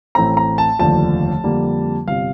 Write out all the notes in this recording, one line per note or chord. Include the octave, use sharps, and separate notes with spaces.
A1 A2 A3 C4 A#5
A#5
A5
F1 D#2 D3 F3 A5
F2 D3 G3 A#3
G1 C3 F5